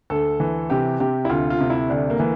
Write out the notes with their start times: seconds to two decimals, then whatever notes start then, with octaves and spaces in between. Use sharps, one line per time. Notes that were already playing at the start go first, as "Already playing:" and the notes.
0.10 D2 A4
0.40 E3
0.70 C3 G4
1.00 C3 G4
1.25 E4
1.30 D2 F4
1.50 F4
1.61 C3
1.70 E4
1.90 D2 D4
2.10 A#3
2.20 E3